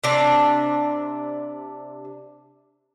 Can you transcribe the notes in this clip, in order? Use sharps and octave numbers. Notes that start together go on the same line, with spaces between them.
C3 D4